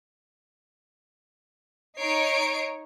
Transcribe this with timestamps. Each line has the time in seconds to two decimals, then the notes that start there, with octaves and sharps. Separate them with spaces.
1.99 D#4 C#5 C7 D7